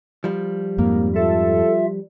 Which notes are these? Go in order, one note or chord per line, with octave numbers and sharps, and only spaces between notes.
F3 G3
F2 G#2 A#3
F4 A4 E5